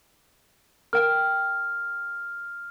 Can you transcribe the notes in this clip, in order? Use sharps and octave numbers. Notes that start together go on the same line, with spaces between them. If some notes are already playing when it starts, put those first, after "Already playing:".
A#4 G5 F6